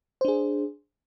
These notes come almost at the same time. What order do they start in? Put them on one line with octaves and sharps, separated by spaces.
C5 D4 G#4